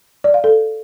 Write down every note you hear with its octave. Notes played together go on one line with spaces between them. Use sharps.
D5
F5
A4